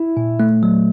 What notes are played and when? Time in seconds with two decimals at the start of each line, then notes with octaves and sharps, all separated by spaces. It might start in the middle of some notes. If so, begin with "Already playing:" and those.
Already playing: E4
0.17 A#2
0.40 A3
0.63 F#3